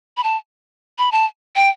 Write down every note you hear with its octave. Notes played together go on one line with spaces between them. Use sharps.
B5
A5
B5
A5
G5